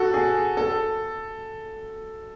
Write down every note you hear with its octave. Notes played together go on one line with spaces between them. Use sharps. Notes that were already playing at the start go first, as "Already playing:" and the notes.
Already playing: F#4 A4
G#4
A4